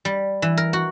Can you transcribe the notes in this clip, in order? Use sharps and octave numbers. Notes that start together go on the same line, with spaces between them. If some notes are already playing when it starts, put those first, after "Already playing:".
G3
E3
A#4
F#4